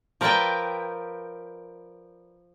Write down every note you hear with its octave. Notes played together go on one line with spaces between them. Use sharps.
F3 A#4 B4 D5 E5 G5